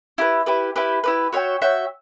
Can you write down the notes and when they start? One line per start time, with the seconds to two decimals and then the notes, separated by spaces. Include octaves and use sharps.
0.18 E4 G4 B4
0.46 E4 G4 B4
0.76 E4 G4 B4
1.04 E4 G4 B4
1.33 F#4 C#5 E5 G5
1.62 F#4 C#5 E5 G5